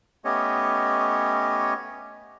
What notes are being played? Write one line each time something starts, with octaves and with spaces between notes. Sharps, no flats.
A3 B3 C#4 G4 C#5 D#5